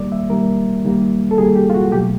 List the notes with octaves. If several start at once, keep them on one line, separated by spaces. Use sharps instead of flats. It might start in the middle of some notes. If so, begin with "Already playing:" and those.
Already playing: D#3 G3 A#3 D5
E5
D#3 G3 A#3 A#4
D#3 G3 A#3
A4
D#3 G3 A#3 G#4
G4
F4
F#4
B2 F#3 A3 G4